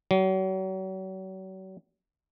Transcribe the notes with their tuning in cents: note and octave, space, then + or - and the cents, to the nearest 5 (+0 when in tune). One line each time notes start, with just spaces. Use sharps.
F#3 +40